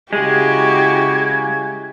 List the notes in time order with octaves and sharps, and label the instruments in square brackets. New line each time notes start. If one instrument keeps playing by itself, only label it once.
[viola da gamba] C#3 E4 F#4 [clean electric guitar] G#3 [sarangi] G4 [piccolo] G#6